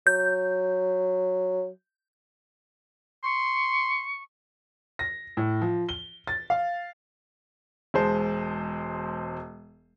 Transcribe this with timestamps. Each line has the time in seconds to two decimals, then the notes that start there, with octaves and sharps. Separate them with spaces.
0.07 F#3 G6
3.24 C6 C#6
4.99 A#6
5.37 A2
5.62 F3
5.89 G7
6.27 A6
6.50 F5
7.94 E1 G#3 C5 A5